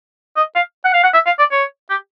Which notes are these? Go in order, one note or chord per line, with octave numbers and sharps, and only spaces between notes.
D#5
F5
F#5
F5
F#5
E5
F5
D5
C#5
G4